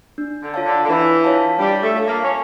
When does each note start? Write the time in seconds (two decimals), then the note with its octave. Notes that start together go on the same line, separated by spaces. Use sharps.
0.18 D4
0.42 D3
0.54 F4 C#5 F5 A5
0.65 D3
0.83 D3
0.88 E3 D4
1.24 F4 C#5 F5 A5
1.59 G3 D4
1.82 A3
1.95 F4 C#5 F5 A5
2.06 A#3
2.23 C#4